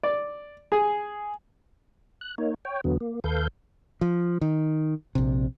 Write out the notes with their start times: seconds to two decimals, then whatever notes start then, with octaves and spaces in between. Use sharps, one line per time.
0.03 D5
0.72 G#4
2.21 F#6
2.38 A#3 D#4 C#5
2.65 C#5 G5
2.84 E2 D3 F#3 B3
3.01 A#3
3.24 D#2 A4 B4 F5 G6
4.01 F3
4.41 D#3
5.15 A#1 C3